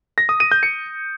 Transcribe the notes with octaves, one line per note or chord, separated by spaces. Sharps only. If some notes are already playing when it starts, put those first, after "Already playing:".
A#6
D#6
D#7
G6
C#7